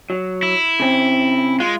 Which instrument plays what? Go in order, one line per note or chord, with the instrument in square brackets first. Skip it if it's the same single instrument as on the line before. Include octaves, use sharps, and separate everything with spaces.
[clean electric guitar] F#3
[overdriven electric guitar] E4
[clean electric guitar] C#3 C4
[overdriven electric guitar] G#3 [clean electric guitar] F4